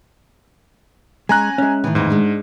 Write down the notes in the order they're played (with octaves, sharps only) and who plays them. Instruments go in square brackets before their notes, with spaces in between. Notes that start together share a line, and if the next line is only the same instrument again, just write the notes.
[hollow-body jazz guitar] G#3 [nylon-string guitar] C#4 [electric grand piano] G#5 A#5 F#6
[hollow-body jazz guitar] G#3 C#4 [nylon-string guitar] E5
[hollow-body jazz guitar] A2 D#3 [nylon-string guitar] E3
[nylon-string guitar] F2 E3 D#4 [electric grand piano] G#2
[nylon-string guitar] G#3 D4